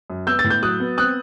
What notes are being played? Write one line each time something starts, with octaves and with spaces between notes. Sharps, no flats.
F#2
B3 E6 G6
A6
A2
G6
F#3 D#6 F#6
B3
C4 D#6 F#6